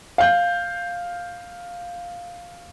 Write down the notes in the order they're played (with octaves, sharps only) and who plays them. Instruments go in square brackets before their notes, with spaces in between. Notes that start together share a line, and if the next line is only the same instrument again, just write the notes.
[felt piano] F5 G6